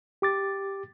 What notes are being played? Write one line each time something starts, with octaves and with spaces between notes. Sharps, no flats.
G4 D6 A6